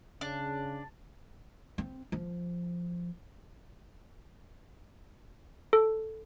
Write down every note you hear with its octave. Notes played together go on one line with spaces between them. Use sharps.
C#3 D4
C4
F3
A4